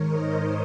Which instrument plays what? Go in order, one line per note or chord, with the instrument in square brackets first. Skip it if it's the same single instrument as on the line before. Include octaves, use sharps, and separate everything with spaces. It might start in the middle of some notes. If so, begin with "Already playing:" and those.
Already playing: [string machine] G#2 D#3 A#4 C5 C#5 D#5
A#4 C#5